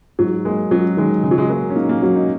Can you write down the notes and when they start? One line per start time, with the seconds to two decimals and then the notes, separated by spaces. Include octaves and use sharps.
0.19 G#2 F#3
0.45 G#3 A#3
0.71 F#3 C#4
0.97 D#3 G#3
1.23 C#3 G#3
1.31 F#3
1.38 G#3
1.50 G#3 A#3
1.70 C#4
1.76 A#3 D#4
1.89 A#3
2.02 F#3 C#4
2.16 D#4